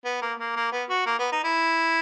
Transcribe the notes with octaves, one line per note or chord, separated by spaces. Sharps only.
B3
A#3
A#3
A#3
B3
F#4
A#3
B3
D#4
E4